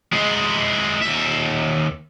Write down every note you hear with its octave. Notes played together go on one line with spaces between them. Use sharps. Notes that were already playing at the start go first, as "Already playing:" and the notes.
G#3 E4
D#2 E5